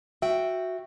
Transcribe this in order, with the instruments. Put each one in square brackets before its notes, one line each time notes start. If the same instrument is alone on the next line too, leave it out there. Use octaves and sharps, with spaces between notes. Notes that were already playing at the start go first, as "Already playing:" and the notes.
[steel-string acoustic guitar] F#4 G5 [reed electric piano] E5